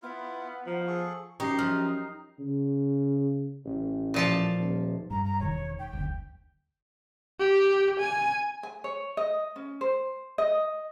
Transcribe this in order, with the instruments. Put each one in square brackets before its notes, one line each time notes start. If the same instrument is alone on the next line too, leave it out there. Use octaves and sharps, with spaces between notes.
[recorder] B3 [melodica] E4 F4
[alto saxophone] F3 [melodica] D#4
[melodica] G#4 A4 C#6
[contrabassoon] F#2 [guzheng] D#4 [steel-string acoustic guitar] G4 [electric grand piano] C#6 C7
[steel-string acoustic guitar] F3 [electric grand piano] F6
[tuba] C#3
A1
[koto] A#2 F3 A5
[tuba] D#1
[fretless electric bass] G2 [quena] A#5
[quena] A#5
[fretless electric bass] E1 D#3 [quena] C#5
[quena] G5
[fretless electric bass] F#1 D2
[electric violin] G4
G#5
[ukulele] G#5
C#5
D#5
C#4
C5
D#5